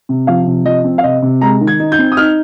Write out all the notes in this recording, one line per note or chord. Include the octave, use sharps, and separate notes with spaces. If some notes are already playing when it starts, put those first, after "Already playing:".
C3
F3 F5
C3
F3 D#5
C4
F5
C3 D#5
C3
G#3 A#5
D#3
G#6
D#4
G6
C4
D#6
D#4 F6